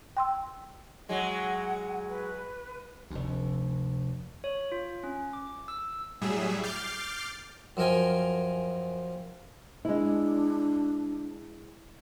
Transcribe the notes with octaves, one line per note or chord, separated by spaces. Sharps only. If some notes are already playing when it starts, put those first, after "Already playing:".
G5 C6 E6
F#3 G#3 F#5
B4
F1 D2
C#5
F4
C#4
D6
E6
A2 F#3 G3 G#4 E5
D6 F6 G6 A6 C7
F#2 F3 A#4 G5 G#5
G#3 D4 E4